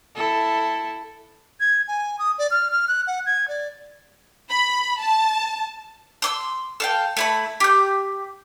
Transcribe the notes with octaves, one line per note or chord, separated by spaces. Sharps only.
E4 A4
G#6
G#5
D#6
D5
F6
F6
F#6
F#5
G#6
D5
B5
A5
C6 D6 E6
A4 F5 G5
A3 E4 B5
G4 G6